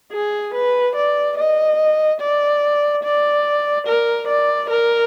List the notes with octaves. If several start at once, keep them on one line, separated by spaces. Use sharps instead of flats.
G#4
B4
D5
D#5
D5
D5
A#4
D5
A#4